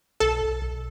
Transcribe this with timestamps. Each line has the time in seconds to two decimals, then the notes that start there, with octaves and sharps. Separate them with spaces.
0.20 B1 A4
0.41 B1
0.62 B1